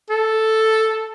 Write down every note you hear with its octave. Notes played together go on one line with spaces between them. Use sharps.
A4